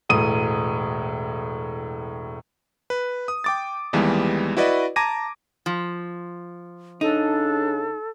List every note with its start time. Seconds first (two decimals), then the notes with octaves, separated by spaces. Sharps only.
0.09 E1 A2 D#6 D#7
2.90 B4
3.28 D#6
3.44 G5 D6 A6
3.93 D#2 E3 G3 G#3 B3
4.57 E4 F#4 B4 D5 D#5
4.96 A5 A#5 D6 G#6 A#6 D#7
5.66 F3
7.01 C#3 D4 D#4 A4